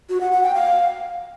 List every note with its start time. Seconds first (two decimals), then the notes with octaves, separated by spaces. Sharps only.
0.09 F#4
0.21 F#5
0.32 F#5
0.43 G5
0.55 F5